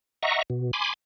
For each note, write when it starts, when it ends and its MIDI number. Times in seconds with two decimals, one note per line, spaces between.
0.23 0.42 75
0.23 0.42 76
0.23 0.42 78
0.23 0.42 82
0.23 0.42 85
0.50 0.71 47
0.73 0.93 80
0.73 0.93 83
0.73 0.93 84
0.73 0.93 86